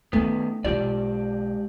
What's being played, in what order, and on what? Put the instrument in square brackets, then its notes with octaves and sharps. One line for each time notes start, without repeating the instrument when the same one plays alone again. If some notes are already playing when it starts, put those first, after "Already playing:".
[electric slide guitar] D#3 B3 [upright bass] A3 C#4
[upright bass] B1 F4 [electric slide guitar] G#2 G4 D5